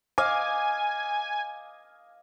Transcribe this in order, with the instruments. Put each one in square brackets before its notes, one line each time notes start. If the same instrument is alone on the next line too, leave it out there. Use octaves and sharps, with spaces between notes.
[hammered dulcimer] D#5 F5 D6 [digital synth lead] G#5